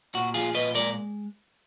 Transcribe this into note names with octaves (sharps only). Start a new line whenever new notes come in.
A#2 F#4
F3 F4 G#4
A#2 B4 D#5
G#3 A#4 D5